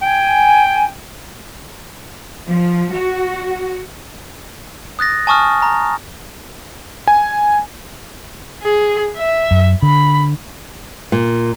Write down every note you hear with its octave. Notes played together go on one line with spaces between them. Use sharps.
G5 G#5
F3
F#4
D#6 F#6 A6 A#6
G#5 A5 C#6 D#6 F6
A#5
G#5
G#4
E5
F#2
D3 B5
A#2